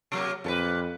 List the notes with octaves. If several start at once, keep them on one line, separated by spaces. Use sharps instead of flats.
C3 F#3 A#3
F2 A#2 A4 B4